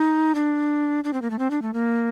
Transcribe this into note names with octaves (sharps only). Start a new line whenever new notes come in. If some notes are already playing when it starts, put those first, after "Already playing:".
Already playing: D#4
D4
D4
C4
A#3
A3
C4
D4
A3
A#3